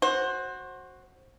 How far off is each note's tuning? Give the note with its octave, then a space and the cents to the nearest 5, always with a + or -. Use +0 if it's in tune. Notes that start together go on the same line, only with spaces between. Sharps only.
F#4 +0 C5 +20